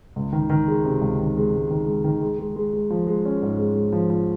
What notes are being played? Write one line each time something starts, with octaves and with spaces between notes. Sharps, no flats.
C#2
D#3
D#3
G#3
C3
C#2
D#3
G#3
C#2
D#3
G#3
D#3
G#3
G#3
G#3
G#3
F3
G#3
C#4
G#2
G#3
G#3
F3
F3